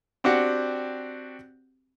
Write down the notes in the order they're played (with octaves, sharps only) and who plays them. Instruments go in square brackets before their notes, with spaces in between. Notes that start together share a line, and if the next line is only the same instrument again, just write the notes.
[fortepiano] C4 D4 F#4 G4 F#5